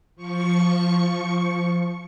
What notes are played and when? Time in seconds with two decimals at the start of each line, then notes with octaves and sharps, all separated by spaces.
0.16 F3 C#6 C#7